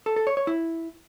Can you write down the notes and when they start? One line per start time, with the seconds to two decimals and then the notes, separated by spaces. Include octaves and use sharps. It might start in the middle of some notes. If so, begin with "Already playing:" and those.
0.06 A4
0.16 A4
0.27 C#5
0.37 C#5
0.47 E4